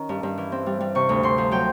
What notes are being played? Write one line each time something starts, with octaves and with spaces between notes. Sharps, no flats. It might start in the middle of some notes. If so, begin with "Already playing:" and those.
Already playing: D#3 C#4
G2
G2
E3
C4
G3
G3
C3 C#6
D2
C3 C6
F3
F#3 G5